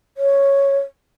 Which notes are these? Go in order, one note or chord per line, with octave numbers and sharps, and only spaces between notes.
C#5